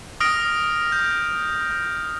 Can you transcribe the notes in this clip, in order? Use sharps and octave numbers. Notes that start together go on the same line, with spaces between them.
D#6 F6 A#6 D7
G6